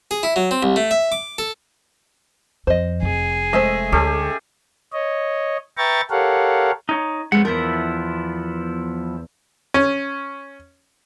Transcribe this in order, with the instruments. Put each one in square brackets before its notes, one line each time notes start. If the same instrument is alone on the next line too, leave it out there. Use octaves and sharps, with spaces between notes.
[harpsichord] G#4
E4
F#3
C4
C2
A3
E5
D6
A4
[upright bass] F2 [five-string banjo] C5 D#5
[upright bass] F1 [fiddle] G#4
[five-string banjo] G#3 A3 C5 [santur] D#5 E5
[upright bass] D2 [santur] C#4 G4 A4
[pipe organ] C#5 D#5
B4 E5 G5 A#5 C#6 A6
G4 A4 A#4 C#5 F5 F#5
[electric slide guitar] D#4 C#5
[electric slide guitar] F2 A3 F#5 [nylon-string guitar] G#3 B4
[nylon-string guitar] E2 A#4 [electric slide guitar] F3 B3 E4
[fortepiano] C#4